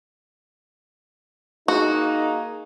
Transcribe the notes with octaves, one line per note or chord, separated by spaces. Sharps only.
A#3 D#4 F#4 G#4